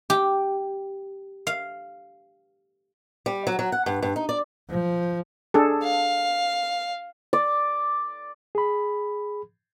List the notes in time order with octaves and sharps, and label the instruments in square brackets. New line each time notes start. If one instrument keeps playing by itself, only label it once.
[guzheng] G4
F5
[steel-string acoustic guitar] G3
F#3
F#3
F#5
G2
G2
D#4
D5
[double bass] F3
[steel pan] D4 G#4 A4
[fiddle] F5
[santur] D5
[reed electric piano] G#4 B5